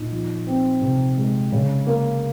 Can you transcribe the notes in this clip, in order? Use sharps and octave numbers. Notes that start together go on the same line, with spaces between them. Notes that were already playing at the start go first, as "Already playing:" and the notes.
Already playing: A#2 D#4
F3
C4
C3
G#3
C#3
A#3